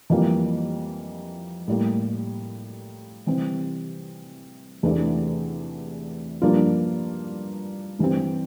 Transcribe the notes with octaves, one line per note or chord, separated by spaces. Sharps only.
F2 E3 G3 A#3 F4
A2 G3 A#3
C3 E3 G3 C4
E2 C3 E3 A3 D4
G2 F3 A#3 D4 F4
G2 E3 G3 C4